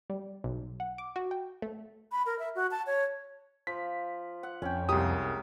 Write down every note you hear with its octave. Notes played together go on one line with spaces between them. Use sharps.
G3
B1
F#5
D6
F#4
G5
A3
B5
A#4
E5
F#4
A5
C#5
F3 B6
F#5
F2 C#4 G5
C2 G#3 A#3 G4 D#6